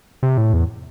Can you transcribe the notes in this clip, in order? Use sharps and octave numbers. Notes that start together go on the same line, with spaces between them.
C3
A2
E2